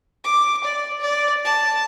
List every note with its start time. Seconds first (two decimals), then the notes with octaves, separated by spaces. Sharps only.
0.24 D6
0.64 D5
1.01 D5
1.45 A5